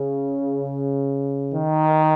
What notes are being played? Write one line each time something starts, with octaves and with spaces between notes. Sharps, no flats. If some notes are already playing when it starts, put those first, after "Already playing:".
Already playing: C#3
D#3